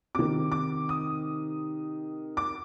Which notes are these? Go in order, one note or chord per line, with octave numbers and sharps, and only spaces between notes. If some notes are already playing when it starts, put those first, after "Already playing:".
C3 D#3 D6
D6
D#6
D6